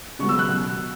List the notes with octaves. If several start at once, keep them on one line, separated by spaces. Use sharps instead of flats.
C#3 F#3 B3 C#6
E6
F#6
B2